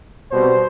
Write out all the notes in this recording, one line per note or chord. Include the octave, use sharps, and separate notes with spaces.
B2 G3 C4 C5